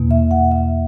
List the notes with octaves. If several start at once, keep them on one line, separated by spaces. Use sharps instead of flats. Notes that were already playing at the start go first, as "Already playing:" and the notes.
Already playing: E2 B2 A#3
E5
F#5
E5